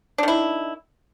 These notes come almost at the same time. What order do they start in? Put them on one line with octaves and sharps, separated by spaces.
D4 D#3 E4